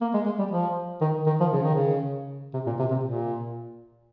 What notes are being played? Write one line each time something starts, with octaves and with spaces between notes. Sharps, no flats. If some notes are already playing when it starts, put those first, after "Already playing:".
A#3
G#3
G#3
G3
F3
D#3
D#3
F3
C#3
D#3
C#3
C3
A#2
C3
C3
A#2